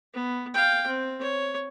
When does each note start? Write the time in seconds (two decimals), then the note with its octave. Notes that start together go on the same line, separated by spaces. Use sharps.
0.14 B3
0.54 F5 G5
0.87 C4
1.21 C#5